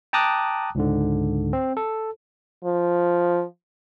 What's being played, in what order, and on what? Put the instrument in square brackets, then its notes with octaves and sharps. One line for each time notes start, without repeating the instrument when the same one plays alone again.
[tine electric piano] G5 A5 A#5 D6 D#6 F#6
C#2 G#2 D3
C4
A4
[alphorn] F3